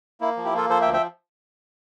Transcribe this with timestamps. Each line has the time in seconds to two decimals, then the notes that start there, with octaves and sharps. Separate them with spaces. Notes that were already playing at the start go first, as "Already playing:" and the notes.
0.21 A#3 E4
0.37 F3
0.45 E4 G4
0.54 A#3 F4 A4
0.69 F3 A4 C5
0.81 E5 G5
0.85 D2
0.93 E5 G5